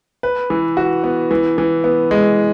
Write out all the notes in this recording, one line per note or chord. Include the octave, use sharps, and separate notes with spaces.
B4
E3
F#4
B3
E3
E3
B3
G#3